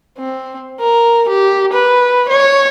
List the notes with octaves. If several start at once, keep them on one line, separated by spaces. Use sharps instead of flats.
C4
A#4
G4
B4
C#5